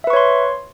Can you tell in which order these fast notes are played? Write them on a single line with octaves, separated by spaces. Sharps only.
E5 B4 C#6 C#5 C6